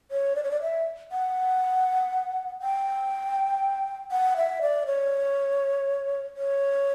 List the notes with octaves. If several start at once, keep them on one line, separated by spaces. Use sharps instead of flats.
C#5
D5
C#5
D5
E5
F#5
G5
F#5
E5
D5
C#5
C#5